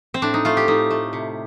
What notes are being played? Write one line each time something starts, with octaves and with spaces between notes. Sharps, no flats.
C4
A2 D4
D#4
A3 F4
G4
A2 D#4
A3
C3